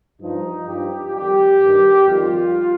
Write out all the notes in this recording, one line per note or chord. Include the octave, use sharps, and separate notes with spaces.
G2 F3 D#4
G2 F3 G4
F2 D#3 G3 G4
G2 D#3 G3
F2 D#3 G3 F4